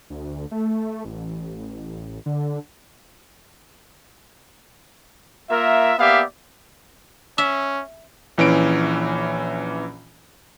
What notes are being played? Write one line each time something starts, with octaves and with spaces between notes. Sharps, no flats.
D2
A3
A1
D3
A#3 F4 A#4 E5
A#3 B3 G4 D5 E5 F5
C#4 E5
A#1 E3 C#4 D7